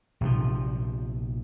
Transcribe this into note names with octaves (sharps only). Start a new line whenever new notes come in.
A#1 C3 E3 F3